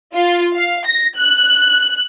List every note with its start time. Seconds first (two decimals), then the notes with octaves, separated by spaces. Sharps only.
0.13 F4
0.56 F5
0.86 A#6
1.18 F#6